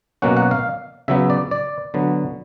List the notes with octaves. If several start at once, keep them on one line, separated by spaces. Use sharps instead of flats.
B2 F#3 A#3 C#4 F#5
F#5
F5
C#3 F#3 B3 E5
D5
D5
D3 F#3 B3